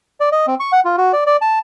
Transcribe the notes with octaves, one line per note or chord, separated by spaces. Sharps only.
D5
D#5
C4
C#6
F#5
F4
F#4
D5
D5
A5